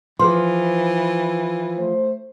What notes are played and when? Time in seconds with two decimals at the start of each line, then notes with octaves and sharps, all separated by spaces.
0.19 E3 F3 G#4 B4 C6
1.78 A3 C5